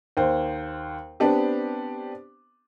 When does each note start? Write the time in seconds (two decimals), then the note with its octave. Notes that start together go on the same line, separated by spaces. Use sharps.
0.17 D#2 C5
1.20 B3 C4 D4 G4